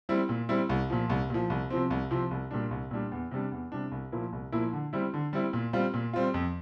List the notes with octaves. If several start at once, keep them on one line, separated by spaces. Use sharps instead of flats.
G3 C4 E4
A#2
G3 C4 E4
C2
A#2 F3
C2
A#2 F3
C2
C3 F3 C4
C2
C3 F3 C4
C2
A#2 G3 D4
C2
A#2 G3 D4
E2
C3 G3 D4
E2
C3 G3 D4
C2
A#2 F3 A#3 E4
C2
A#2 F3 A#3 E4
D3
G3 C4 E4
D3
G3 C4 E4
A#2
G3 C4 F4
A#2
G3 C4 F4
F2